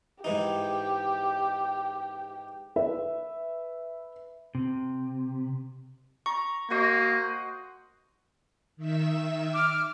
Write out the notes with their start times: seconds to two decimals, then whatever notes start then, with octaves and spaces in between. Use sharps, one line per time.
0.24 G#2 E3 D#4 G4
2.76 B4 E5
4.55 C3
6.26 A#5 C#6
6.70 A#3 F#4 C5 D#5
8.77 D#3 E5 E6
9.53 D6 F6